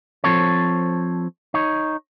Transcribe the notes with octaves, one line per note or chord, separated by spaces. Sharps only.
F3 C4 A4 C#5
D#4 C#5